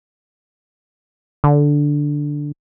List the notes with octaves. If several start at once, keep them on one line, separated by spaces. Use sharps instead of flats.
D3